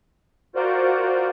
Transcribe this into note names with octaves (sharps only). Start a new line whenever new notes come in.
F4 F#4 A#4 C5 D5